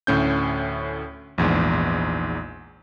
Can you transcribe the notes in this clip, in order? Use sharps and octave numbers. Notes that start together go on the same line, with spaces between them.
D2 A2 C#4 G6
A#1 E2 G#2